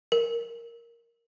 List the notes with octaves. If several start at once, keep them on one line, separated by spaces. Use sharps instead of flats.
A#4